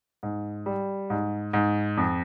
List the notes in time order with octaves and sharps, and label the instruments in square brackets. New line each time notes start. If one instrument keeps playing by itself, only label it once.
[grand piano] G#2
G3
G#2
G#2
F2